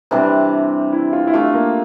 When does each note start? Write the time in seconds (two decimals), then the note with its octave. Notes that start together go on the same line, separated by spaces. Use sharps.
0.11 C3 E3 G3 C4 D4
0.93 E4
1.13 F4
1.27 E4
1.34 A3 D4 F4 G4
1.54 A#3